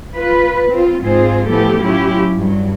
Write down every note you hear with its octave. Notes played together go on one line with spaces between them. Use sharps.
F4 B4
C4 F4
G#2 C4 F4 G#4 C5
A2 E3 F3 B3 G4 A4
F#3 C#4 E4 F4 G4
G2 F#3